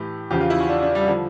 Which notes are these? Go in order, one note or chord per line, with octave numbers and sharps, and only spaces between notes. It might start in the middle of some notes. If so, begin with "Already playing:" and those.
Already playing: A2 E3 G4
E2 C#3 F3 G4
F4
E4
C#4
D4
D4
G3
D3 F3